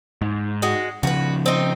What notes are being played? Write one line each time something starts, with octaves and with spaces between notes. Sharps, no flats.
G#2
G#3 F#4
C#3 F3 F#4 B4
C4 D#4